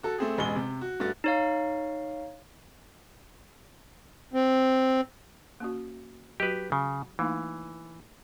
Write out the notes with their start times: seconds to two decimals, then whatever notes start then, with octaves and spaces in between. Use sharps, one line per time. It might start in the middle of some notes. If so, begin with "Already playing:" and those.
0.03 F#4 A4
0.18 A3 C4 G#4
0.38 E1 A1 G#3 G7
0.56 C3
0.81 F#4
1.00 G2 A3 F#4 A6
1.24 D#4 C#5 F5
4.33 C4
5.60 A#3 C#4 F#4
6.40 F#3 F#4 G4 B4
6.72 C#3
7.19 E3 A3 A#3 D#4